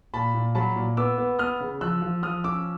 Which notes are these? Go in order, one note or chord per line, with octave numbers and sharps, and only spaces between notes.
A#2 A5 B5
A#2
F#3 A5 B5
A#2
B3 D6 E6
B3
B3 D#6 F6
C#3
F3 E6 F#6
F3
F3 D#6 F6
C#4 D6 E6